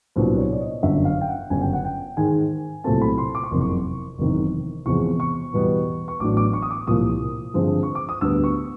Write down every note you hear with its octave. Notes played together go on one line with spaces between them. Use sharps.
C2 A#2 F#3 B3 D4 C5
C#5
D5
D#5
G1 F#2 D3 E5
F5
G5
F#5
G1 F#2 C#3 G#5
G5
F#5
G5
G#2 D#3 G#3 G#5
C2 A#2 F#3 A3 C4 A5
B5
C6
D6
C#6
F#1 F2 C3 C6
C#6
F#1 E2 C3 D#3
E1 E2 C3 F3 G#3 C#6
C#6
E2 B2 G3 B3
C#6
A1 A2 F#3 B3 D4 D6
D6
C#6
D#6
D6
C2 A#2 F3 A#3 D#6
G2 D3 F3 G#3 C4
C#6
D6
D#6
D2 D3 G3 B3 E6
C#6